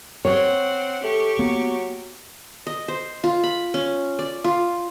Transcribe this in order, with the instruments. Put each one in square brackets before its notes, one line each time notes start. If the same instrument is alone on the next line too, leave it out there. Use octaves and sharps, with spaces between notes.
[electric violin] C4 F#5 [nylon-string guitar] C#5
[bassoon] A3 [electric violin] G4 C#6
[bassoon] F#3 [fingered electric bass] A#3 B3
[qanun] D#5
C5
F4
B5
C#4
D5
F4